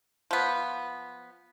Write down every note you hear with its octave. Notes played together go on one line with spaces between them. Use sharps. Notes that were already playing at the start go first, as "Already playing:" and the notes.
F3 B3